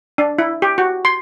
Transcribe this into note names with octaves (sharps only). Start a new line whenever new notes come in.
D4
E4
G4
F#4
C6